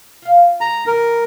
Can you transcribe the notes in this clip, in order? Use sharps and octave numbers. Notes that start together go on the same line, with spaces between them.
F4 F5
G#3 A#5
D#3 E3 G3 A#4